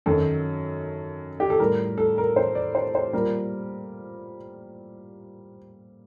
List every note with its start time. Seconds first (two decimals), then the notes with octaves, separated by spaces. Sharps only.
0.06 F#2 D#3 F#3 A4
1.40 G4
1.50 A4
1.60 A2 G3 A#4
1.98 A4
2.18 A#4
2.36 C5
2.55 D5
2.75 C5
2.95 C5
3.13 A#2 G3 A#4